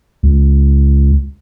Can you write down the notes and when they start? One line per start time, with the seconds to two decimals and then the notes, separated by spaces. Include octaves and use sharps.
0.23 C#2